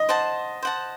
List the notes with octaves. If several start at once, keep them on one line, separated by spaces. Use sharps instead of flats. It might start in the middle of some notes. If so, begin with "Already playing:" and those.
Already playing: D#5
C5 F#5 A5
C5 F#5 A5